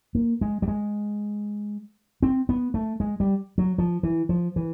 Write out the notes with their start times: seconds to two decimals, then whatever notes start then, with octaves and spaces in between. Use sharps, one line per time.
0.15 A#3
0.41 G#3
0.62 G3
0.68 G#3
2.22 C4
2.49 B3
2.74 A3
3.00 G#3
3.20 G3
3.58 F#3
3.78 F3
4.03 E3
4.29 F3
4.56 E3